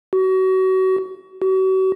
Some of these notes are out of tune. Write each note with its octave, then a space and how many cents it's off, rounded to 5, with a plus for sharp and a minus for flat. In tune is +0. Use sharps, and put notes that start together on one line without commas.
F#4 +30
F#4 +40